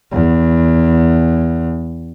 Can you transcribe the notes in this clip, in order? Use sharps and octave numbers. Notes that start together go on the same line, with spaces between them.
E2